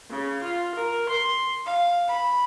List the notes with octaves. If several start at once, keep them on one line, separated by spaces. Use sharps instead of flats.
C#3
F4
A#4
C6
F5
B5